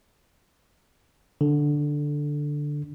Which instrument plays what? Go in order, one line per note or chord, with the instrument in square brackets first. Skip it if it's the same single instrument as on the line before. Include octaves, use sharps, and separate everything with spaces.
[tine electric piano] D3